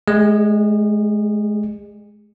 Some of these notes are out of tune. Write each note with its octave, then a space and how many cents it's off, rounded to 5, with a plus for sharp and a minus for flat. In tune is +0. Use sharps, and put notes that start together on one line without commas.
G#3 +30 G#4 -35 D#5 -45